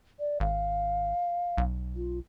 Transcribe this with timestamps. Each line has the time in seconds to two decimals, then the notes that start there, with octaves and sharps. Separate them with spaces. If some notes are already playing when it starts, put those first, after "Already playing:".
0.19 D5
0.40 G#1 F5
1.58 B1
1.96 F4